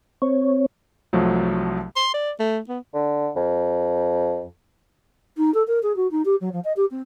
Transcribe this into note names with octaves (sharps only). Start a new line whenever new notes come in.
C4 C#5
C2 F3 F#3 A3
C6
D5
A3
B3
D3
F2
D#4
A4
A#4
G#4
F#4
D#4
G4
F#3
F3
D#5
G4
C4